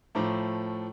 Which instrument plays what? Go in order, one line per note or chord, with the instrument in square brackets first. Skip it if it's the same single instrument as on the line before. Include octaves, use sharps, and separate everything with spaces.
[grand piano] A2 F3 A3 A#5 D6